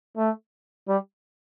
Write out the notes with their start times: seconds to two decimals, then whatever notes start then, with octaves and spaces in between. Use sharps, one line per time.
0.17 A3
0.88 G3